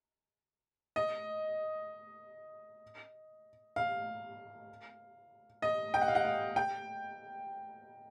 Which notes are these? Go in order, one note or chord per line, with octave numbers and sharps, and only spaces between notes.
D#5
F5
D#5
G5
F#5
F5
F#5
F5
G5